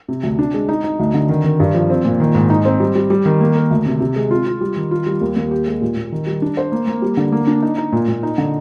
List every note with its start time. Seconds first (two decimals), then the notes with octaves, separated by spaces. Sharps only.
0.08 C3
0.23 D2
0.39 D4
0.54 G#3
0.69 D#4
0.84 D#4
0.99 D2
1.14 D3
1.29 D#3
1.44 D#3
1.60 G2
1.74 F3
1.90 C4
2.04 A#2
2.20 D#3
2.35 G#2
2.50 D#4
2.65 C4
2.80 G3
2.95 G3
3.10 G3
3.26 D#3
3.41 A#3
3.55 A#4
3.71 D2
3.86 C3
4.00 C3
4.16 G#3
4.31 F4
4.47 F4
4.61 G3
4.77 D#3
4.91 F4
5.06 G3
5.21 D#2
5.36 D#2
5.51 G4
5.67 G#3
5.81 A#2
5.97 A#2
6.12 D#3
6.27 G3
6.42 D4
6.57 C5
6.72 A#3
6.87 A#3
7.02 G3
7.17 D3
7.32 A#3
7.47 D4
7.62 D#4
7.78 D#4
7.92 A#2
8.08 A#2
8.23 D#4
8.38 D3